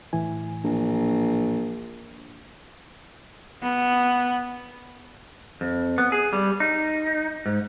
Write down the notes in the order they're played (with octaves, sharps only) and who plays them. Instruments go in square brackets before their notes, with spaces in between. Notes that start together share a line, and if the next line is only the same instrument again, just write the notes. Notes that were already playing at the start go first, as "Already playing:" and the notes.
[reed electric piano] A2 E3 G#5
[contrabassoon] A#1
[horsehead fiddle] B3
[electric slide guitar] F2
B3
G#4
G3
D#4
G#2